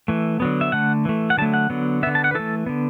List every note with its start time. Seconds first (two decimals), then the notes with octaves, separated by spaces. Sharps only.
0.08 E3 A3
0.40 D3 F#3 B3
0.61 E5
0.72 D3 A3 F#5
1.05 E3 A3
1.30 F#5
1.38 D3 F#3 A3 A5
1.54 F#5
1.70 D3 F#3 B3
2.03 B3 E5
2.07 D3
2.15 A5
2.24 F#5
2.31 B4
2.35 E3 A3 A4
2.66 D3 B3